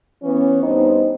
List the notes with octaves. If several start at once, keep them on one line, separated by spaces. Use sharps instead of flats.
E3 B3 C#4
G2 B3 C4 D#4